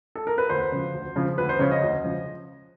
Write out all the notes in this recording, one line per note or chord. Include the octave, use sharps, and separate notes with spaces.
A4
A#4
B4
D2 C5
C#3 F3
D2
C#3 F3
D2 B4
C5
C#3 F3 C#5
D#5
D2
C#3 F3